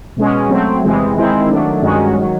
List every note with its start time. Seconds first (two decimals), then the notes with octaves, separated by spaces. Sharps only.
0.17 B2 G#3 C#4
0.49 F#3 A3 C4
0.83 E2 C3 E3 G#3 C4
1.16 D#3 G#3 C4 E4
1.49 D#3 F#3 A3 D4
1.82 G2 D#3 G#3 C#4 F#4
2.17 D#3 F#3